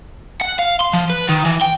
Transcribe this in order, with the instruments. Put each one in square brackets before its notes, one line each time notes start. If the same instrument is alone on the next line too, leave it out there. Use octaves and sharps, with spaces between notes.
[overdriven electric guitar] F#5
F5
C6
F3
B4
D#3
E3
G5